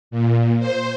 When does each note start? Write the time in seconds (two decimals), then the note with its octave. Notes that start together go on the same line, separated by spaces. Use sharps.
0.11 A#2
0.60 C5